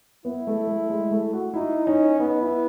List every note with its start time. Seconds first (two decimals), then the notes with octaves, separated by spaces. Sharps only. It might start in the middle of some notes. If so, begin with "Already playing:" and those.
0.25 B3 E4
0.47 A3
0.67 A3
0.90 G#3
1.11 A3
1.33 F#4
1.54 D#4 E4
1.86 C#4 D#4
2.19 B3 D#4
2.41 E4